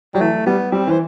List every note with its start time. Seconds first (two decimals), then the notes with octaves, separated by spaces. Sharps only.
0.14 F#3 G3
0.20 E3 A3
0.46 G3 B3
0.72 G3 C4
0.87 E3 C5